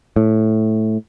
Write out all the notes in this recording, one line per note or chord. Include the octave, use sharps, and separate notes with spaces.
A2